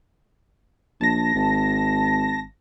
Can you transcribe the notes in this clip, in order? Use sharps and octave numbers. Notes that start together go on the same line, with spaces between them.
A#1 A5 A#6
G#1